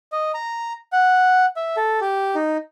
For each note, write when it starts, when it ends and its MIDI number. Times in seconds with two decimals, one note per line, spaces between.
0.12 0.32 75
0.34 0.73 82
0.92 1.46 78
1.56 1.76 76
1.77 1.99 69
2.01 2.35 67
2.35 2.57 63